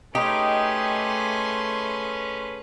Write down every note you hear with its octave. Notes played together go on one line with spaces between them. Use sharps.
A3 C#4 D#4 G4 G#4 B4 C6